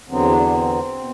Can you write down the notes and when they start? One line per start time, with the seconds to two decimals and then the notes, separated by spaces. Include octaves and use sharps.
0.09 E2 D3 F#3 B3 C4
0.31 D4
0.53 C4
0.98 B2